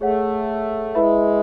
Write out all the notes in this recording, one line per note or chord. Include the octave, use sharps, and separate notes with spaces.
A3 G#4 C#5 F#5
G#3 E4 B4 E5 B5